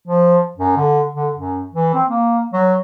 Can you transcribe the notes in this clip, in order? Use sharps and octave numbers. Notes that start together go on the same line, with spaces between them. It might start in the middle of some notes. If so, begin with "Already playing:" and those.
F3
F#2
D3
D3
F#2
E3
C4
A#3
F#3